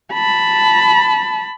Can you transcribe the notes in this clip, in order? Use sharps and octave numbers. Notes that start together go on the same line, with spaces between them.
A5 B5